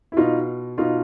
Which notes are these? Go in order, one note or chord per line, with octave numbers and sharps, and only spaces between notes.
E4
B2 D#4 F4
B2 D#4 F4